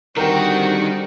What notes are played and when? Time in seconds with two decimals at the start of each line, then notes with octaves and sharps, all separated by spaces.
0.17 D3 D#3 G3 C4 F#4 A#4 G5